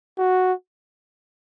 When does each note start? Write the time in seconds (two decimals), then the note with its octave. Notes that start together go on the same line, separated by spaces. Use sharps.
0.18 F#4